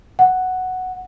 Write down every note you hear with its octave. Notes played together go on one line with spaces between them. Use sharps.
F#5